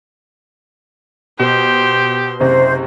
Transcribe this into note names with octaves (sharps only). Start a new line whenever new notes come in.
B2 G4 C5
F#1 C3 C5